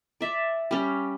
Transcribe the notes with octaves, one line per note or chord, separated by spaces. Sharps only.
D5 E5
G3 C#4